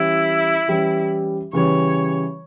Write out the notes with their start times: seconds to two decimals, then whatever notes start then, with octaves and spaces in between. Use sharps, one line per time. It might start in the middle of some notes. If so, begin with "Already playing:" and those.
Already playing: E3 G3 C#4 E4 G4
0.68 E3 G3 C#4 G4
1.53 C#3 E3 G3 C#5